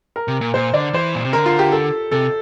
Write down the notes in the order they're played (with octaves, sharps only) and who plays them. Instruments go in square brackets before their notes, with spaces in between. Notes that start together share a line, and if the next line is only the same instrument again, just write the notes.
[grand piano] A#4
[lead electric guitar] C3
A#2
[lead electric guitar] A#2 [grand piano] C5
[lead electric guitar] D3 [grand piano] D5
[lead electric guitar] E3 [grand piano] C5
[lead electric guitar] A#2
C3
[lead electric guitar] D3 [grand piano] A#4
[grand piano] F4
G4
A4
[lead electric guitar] C3 [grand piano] A4